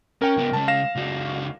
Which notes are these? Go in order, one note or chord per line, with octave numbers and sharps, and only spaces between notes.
C#4 A#4 G5
C#2 B3
C#3 G#3 A5
F5 A#6 E7
C#2 F#4